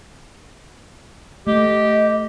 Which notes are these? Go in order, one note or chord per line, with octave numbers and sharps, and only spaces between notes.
A3 G4 D#5